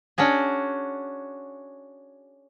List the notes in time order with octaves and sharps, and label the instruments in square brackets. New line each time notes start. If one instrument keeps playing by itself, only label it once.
[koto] C#4 D4 F#4 G#4